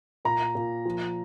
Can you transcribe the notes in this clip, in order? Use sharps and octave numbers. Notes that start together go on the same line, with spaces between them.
A#2 A#5
A#2
F3